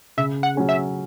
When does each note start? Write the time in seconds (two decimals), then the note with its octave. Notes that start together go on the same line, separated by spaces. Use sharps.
0.17 C#3 E5
0.43 F#5
0.55 F#3 C#4 G#4
0.69 E5